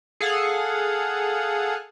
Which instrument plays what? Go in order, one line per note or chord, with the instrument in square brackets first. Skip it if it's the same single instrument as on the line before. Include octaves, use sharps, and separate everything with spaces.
[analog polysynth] G#4 A4 F5 F#5